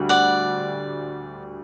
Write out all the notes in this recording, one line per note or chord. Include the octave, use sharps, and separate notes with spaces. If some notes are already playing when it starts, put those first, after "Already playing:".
Already playing: D2 D3 G3
D5 F#5